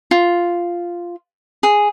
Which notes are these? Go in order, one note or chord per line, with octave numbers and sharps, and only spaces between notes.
F4
G#4